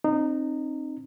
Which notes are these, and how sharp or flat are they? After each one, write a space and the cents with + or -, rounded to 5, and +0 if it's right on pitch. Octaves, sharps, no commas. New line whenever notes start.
C4 +25 D#4 -20